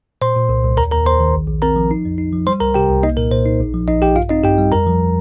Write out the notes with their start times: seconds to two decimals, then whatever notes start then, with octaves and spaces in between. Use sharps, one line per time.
0.22 A#2 C5 C6
0.36 A#2
0.49 C2
0.64 C2
0.77 D#2 A#4 A#5
0.91 D#2 A#4 A#5
1.06 D#2 C5 C6
1.20 D#3
1.34 A#1
1.48 A#1
1.62 C4 A#4 A#5
1.76 F3
1.91 D#4
2.05 F2
2.18 D#4
2.33 F3
2.47 G3 C5 C6
2.60 C2 A#4 A#5
2.74 C3 G4 G5
2.90 C2
3.03 A#3 D#4 D#5
3.17 A#2 A#4
3.31 A#2 C5
3.46 D#4
3.60 A#1
3.74 F3
3.88 A#1 D#4 D#5
4.02 A#1 G4 G5
4.15 G2 F4 F5
4.29 C4 D#4 D#5
4.43 G2 G4 G5
4.58 G3
4.72 F2 A#4 A#5
4.87 F3